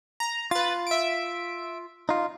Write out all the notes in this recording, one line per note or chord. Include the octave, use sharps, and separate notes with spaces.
A#5
F4 B4 A6
E5 D7
D#4 F4